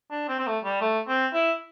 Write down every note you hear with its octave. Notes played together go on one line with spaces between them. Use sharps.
D4
C4
C4
A3
G3
A3
C4
E4